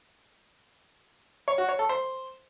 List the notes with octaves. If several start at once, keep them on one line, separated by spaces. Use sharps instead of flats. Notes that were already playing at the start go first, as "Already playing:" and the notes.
C#5
F#4
C#5
A4
C5